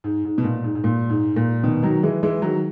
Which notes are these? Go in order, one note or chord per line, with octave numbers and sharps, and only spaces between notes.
G#2
G#2
B2
A#2
G#2
G#2
A#2
G#2
A#2
B2 D#3
D#3 F#3
E3 G#3
E3 G#3
D#3 F#3